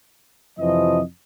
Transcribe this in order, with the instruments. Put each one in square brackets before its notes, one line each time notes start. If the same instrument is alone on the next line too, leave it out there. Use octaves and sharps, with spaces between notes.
[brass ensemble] F2 C3 E3 F3 D#5